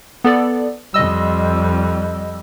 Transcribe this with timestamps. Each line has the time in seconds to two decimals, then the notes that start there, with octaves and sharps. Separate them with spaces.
0.24 B3 A4 D5
0.94 F2 G3 D#5 E6